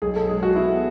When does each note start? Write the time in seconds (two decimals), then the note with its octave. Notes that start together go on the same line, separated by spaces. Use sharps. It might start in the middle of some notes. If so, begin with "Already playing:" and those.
0.02 B1 G#4
0.16 A4
0.28 G#3 G#4
0.43 F#4
0.56 B3 E4